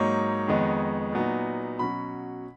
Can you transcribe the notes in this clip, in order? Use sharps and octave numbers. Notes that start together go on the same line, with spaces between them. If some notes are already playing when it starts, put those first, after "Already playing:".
Already playing: G#2 F#3 A#3 D#4 C#5
F2 D#3 G#3 B3 D#4
A#2 F#3 B3 D#4
B2 F#3 C#4 B5